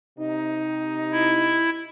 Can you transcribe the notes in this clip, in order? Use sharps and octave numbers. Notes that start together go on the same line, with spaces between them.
C3 D#4
E4